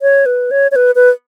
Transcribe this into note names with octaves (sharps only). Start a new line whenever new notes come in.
C#5
B4
C#5
C#5
B4
B4